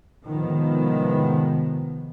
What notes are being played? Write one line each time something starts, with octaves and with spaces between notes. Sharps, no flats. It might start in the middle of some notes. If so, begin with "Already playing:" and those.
A2 C3 D#3 F3 G#3 B3